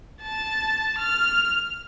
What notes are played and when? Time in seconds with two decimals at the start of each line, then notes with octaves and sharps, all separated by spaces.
0.22 A5
0.98 F6